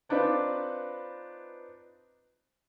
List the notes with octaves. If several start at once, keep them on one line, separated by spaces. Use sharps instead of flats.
C4 D4 D#4 F4 B4